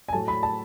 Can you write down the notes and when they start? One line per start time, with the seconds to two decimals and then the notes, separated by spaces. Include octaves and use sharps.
0.09 G#5
0.13 A2 F#3 A3 A5
0.28 B5
0.43 A5